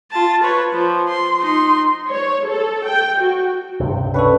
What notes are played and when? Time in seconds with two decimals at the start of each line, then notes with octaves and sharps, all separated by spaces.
0.11 F4 A5
0.43 B4 C#5
0.73 F3
1.08 C6
1.41 D#4 C6
2.10 C#5
2.48 A4
2.88 G5
3.20 F#4
3.80 C#2 G2 C3
4.14 C#4 D4 A4 B4 C#5